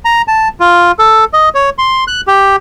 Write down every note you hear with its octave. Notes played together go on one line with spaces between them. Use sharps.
A#5
A5
F4
A4
D#5
C#5
C6
F#6
G4